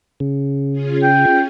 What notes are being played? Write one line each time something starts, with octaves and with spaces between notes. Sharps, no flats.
C#3
C#4 F4 G#4
G5